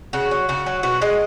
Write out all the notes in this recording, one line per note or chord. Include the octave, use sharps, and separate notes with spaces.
C#3 F#4
F#3
C#3 F#4
F#3
B2 F#4
G#3 D#5